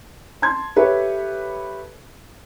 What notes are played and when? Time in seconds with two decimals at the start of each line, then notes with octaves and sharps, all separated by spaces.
0.42 A5 C6 G#6
0.76 G4 A4 B4 C#5 E5